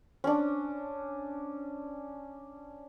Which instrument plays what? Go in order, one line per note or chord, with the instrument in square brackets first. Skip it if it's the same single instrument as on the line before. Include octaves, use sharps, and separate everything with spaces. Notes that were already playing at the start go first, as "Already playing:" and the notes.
[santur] C#4 D4